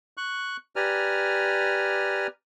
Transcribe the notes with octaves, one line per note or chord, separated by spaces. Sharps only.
C#6 F#6
G4 B4 D5 G#5 A#5 F6